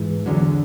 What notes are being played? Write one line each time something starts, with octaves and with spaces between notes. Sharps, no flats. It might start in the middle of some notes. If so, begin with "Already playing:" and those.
Already playing: G#2 E3
E2 D3 F#3